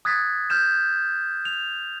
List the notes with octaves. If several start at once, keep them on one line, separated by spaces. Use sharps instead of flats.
D#6 F#6 G#6 A6 B6
F6 G6 E7
F7